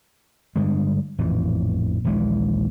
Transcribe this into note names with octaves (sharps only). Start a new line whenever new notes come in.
G2 D3 G#3
A1 F2 A#2 E3
A#1 D#2 E3 G#3